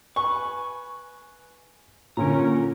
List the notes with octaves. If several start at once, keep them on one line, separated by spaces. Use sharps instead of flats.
B4 G#5 C#6
A#2 D3 C#4 A#4 A#5